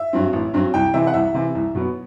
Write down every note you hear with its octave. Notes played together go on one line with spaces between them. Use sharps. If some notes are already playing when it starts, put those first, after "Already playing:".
Already playing: E5
G2 F#3 C4
A1
G2 F#3 C4
C2 G5
C3 E3 E5
F#5
C2 E5
C3 E3
C2
B2 F#3 B3